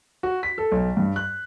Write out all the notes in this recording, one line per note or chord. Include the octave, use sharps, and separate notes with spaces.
F#4
B6
A4
B1
G2
F#6